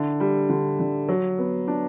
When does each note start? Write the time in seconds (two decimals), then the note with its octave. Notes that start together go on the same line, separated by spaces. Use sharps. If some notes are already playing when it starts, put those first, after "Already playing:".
Already playing: D3 E4
0.20 G3
0.50 D3
0.80 D3
1.08 F#3
1.39 B3
1.68 D4